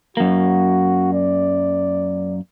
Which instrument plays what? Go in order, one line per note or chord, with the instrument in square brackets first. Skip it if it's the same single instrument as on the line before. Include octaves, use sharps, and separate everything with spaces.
[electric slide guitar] F#2 A#3 [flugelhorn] F#4
[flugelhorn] D5